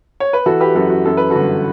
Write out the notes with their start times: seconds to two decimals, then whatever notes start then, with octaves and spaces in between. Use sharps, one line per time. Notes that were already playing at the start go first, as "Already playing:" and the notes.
0.20 C#5
0.33 B4
0.46 E3 F#4 A4
0.60 G4 B4
0.75 F#2 F#4 A4
0.90 F#4
1.05 F#2 A4
1.17 B4
1.30 G1 F#4 A4